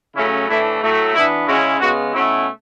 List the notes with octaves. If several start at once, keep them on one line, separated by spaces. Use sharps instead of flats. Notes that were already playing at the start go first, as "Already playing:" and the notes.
C#3 F#3 A3 C#4 E4
A2 E3 A3 D4 E4
A2 F#3 A3
E3 B3 D4 E4
C#3 G#3 C#4 E4 F#4
C#3 G#3 B3 F#4
B2 A3 C#4 E4 F#4